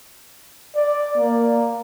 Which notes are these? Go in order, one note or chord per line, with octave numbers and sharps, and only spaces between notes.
D5
A#3